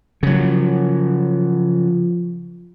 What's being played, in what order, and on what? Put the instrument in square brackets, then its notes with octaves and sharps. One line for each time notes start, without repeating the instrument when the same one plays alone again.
[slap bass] C#3 F#3 [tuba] F3